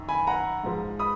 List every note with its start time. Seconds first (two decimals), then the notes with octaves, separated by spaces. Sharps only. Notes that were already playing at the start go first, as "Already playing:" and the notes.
Already playing: F#2 D#3
0.09 G#5 B5
0.27 F#5 A#5
0.64 G#2 F3 G#3
0.99 B5 D#6